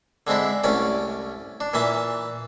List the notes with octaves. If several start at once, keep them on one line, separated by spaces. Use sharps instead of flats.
D3 G#3 C4 D4 E4
C2 A3 C#4 D5
D4
A#2 E3 E5 A5